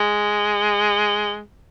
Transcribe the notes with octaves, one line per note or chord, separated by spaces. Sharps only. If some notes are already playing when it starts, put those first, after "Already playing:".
Already playing: G#3